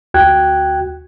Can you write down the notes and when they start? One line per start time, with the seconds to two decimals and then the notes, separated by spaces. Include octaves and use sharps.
0.14 D2 F#4 G5 F#6 G#6